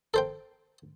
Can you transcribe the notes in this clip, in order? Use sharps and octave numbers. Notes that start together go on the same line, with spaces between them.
A4 C5 G5